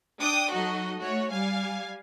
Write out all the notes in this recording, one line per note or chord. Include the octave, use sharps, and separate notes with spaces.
D4 G5 D6 D#6
F#3 D#4 F#4 A4 D#5
A3 F#4 C#5
G3 F5 G#5